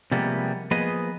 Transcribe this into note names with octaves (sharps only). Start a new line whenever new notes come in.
C3 F3 G3 G#3 A#3 B3
F3 A#3 B3 G#4 B4 D#5